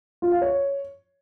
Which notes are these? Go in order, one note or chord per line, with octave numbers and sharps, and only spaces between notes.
F4
F5
C#5